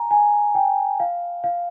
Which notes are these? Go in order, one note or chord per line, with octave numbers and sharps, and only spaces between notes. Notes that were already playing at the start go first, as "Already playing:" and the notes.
Already playing: G#5 A#5
G#5
G5
F5
F5